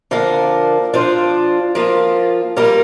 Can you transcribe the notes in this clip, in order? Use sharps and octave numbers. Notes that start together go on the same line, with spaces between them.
D3 F3 A#3 D4 A#4
F3 D4 F4 C5
F3 A#3 F4
G3 A#3 F4 A#4